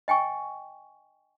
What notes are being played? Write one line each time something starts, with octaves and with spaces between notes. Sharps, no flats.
D#5 G5 G#5 C#6